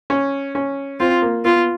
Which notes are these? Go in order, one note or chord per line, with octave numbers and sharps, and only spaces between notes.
C#4
C#4
C4 F4
A#3
B3 F4